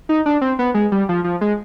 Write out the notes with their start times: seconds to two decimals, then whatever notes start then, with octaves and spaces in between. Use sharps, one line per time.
0.09 D#4
0.26 D4
0.41 C4
0.59 B3
0.74 G#3
0.92 G3
1.09 F3
1.24 F3
1.41 G#3